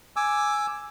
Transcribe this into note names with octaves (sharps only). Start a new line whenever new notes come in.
G#5 D6 E6